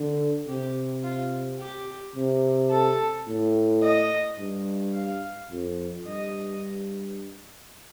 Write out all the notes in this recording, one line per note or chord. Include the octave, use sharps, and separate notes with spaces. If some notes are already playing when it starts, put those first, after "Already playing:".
Already playing: D3
C3 G4
F4
G4
C3
A4
A2
D#5
G2
F5
F2
G2 D#5